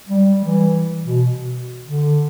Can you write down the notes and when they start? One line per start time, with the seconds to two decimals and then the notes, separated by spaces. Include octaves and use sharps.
0.08 G3
0.44 E3
1.04 B2
1.87 D3